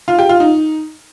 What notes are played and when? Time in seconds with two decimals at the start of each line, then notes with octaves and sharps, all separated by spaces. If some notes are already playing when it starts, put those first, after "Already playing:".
0.08 F4
0.19 G4
0.29 F4
0.40 D#4